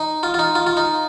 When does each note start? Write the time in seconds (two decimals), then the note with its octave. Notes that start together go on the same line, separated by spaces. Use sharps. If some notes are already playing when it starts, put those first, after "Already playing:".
Already playing: D#4
0.23 F4
0.34 F4
0.39 D#4
0.55 F4
0.67 F4
0.77 D#4